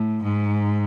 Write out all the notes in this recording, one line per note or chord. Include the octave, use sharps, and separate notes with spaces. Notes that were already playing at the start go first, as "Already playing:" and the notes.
Already playing: A2
G#2